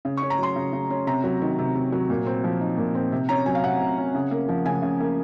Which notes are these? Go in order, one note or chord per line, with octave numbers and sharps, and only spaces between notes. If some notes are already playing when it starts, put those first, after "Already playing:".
C#3
C#4 C#6
A#5
F#3 C6
C#3
C#3
C#4
C3 A#5
F#3
D#3
C3
C3
F#3
A#2
C4
F3
D#4
A#2
C4
C3
C#4 A#5
F#3 G#5
F5
C3 F#5
C3
C#4
C#3
A#3
F3
C#3 G#5
C#3
A#3